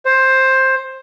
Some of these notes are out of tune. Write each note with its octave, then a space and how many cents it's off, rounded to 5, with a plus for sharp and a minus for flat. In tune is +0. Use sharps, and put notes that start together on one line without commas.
C5 +10